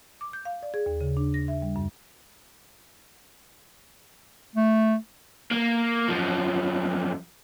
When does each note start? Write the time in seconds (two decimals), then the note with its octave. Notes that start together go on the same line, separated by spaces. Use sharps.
0.21 D6
0.33 G6
0.45 F5
0.63 D5
0.74 G#4
0.86 D#2
1.01 C#3
1.17 D4
1.34 A#6
1.48 E5
1.62 G3
1.76 F#2
4.56 A3
5.51 A#3
6.09 F#2 F3